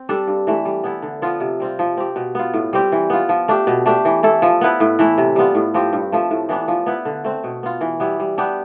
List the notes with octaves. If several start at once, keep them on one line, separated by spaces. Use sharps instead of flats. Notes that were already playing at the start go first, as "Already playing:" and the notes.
Already playing: C4
G3 D4 A4
G2
E3 A3
G3
B3 E4 A4
D3
F3 B3 F4
C3
G3 C4 F4
F3
C4 G4
B2
B3 F4
A2
G3 C4 G4
E3
B3 F4
F3
A3 D4 G4
B2
A3 D4 G4
E3
A3 E4 A4
F3
B3 E4 B4
A2
E3 A3 E4
C3
G3 B3 F4
A2
F3 C4 G4
G2
F3 A3
A2
E3 B3 D4
F3
B3 E4 B4
D3
A3 C4
B2
B3 F4
E3
G3 B3 E4
G3
B3 D4 G4